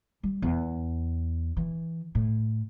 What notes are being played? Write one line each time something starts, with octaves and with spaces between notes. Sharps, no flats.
G3
E2
E3
A2